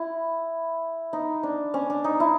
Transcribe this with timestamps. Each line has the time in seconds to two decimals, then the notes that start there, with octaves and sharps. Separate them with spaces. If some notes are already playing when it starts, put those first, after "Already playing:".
Already playing: E4
1.13 D#4
1.43 D4
1.74 C#4
1.90 D4
2.04 D#4
2.20 E4